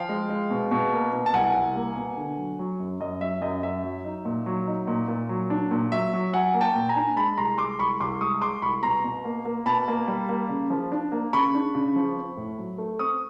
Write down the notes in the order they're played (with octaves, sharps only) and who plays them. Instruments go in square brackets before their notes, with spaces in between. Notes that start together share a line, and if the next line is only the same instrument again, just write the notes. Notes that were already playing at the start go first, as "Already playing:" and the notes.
Already playing: [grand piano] F3 F5 G5
G#3
G#3
B2
B2
A#3
B2
A5
C2 F#5 G#5
C2
A#3
B2
D3
F#3
F#3
F#2
F#2 D#5
F#3 E5
F#2 D#5
F#2 E5
F#3
D#4
A#2
F#3
D#4
A#2
A#2
F#3
D4
A#2
F#3 E5
F#3
F#3 F#5 G#5
A#3
G5 A5
A#2
G#5 A#5
D4
G#3 A5 B5
C2 A#5 C6
G#3 C6 D6
C2 B5 C#6
C2 C6 D6
G#3 C#6 D#6
G#3 C6 D6
C2 B5 C#6
B2 A#5 C6
B2
A#3
A#3
B2 A5 B5
A#3
G3
A#3
C#3
F3
D4
A#3
C#3 B5 C#6
D4
C#3
F3
C4
A2
F#3
A3
C4 C#6 D#6